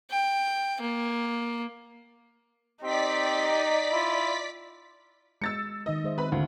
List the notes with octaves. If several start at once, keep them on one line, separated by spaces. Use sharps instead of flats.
G5
A#3
C4 D#4 G4 D5 B6
E4 F4
G#3 E6 A6 C#7
D#3 D#4 B4 D#5
G#3 C5 E5
C4 B4 B5
D2 E4 C5 F5